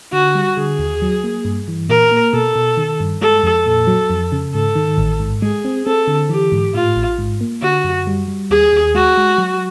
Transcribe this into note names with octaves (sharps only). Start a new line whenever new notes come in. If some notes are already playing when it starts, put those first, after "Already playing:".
D3 F#4
G3
D3 G#4
D#2
F#3
A#3
G2
E3
A#2 A#4
A#3
B2 A4
B2
D#3
G2
G#3 A4
F2
A#2 A4
F#3
F2
C#3
G#2 A4
D#3
A1
G#2
G#3 G#4
C4
C4 A4
D3
E3 G4
G#2
A2 F4
A1
G#2
A#3
D3 F#4
F#2
G3
G3
D#2 G#4
D#2
G#3 F#4
G#3
F#3